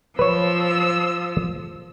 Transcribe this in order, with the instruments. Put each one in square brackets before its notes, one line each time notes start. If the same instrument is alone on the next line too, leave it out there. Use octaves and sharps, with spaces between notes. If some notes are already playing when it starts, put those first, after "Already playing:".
[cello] F3 [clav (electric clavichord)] B4 C#5 [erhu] E6